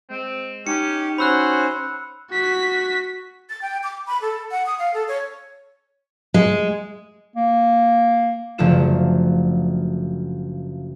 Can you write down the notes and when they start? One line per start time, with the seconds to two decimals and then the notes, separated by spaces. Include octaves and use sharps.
0.10 G#3 C4
0.67 C#4 D#4 G4 C#7
1.18 C#4 F#4 C5 B5 E6 F#6
2.30 F#4 B6
3.49 A6
3.62 G5
3.83 D6
4.07 B5
4.21 A4
4.51 F#5
4.66 D#6
4.79 F5
4.94 A4
5.08 C#5
6.34 G#3
7.36 A#3
8.58 F#1 D3 F3 A3 F4 E7